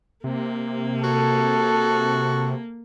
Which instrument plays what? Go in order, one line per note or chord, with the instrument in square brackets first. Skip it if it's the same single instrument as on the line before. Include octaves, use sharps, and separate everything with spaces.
[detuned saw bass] C3 [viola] A#3
[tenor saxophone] F#4 [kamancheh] A4